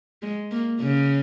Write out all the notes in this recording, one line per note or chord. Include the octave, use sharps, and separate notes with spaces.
G#3
A#3
C#3